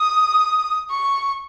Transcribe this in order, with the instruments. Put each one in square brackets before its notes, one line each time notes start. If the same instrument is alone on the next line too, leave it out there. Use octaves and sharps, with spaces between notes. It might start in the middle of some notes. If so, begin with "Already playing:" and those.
Already playing: [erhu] D#6
C#6